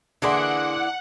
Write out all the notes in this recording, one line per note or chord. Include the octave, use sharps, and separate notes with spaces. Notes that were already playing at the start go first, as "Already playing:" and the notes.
D3 E3 A#3 D4 G#4 F#5 C6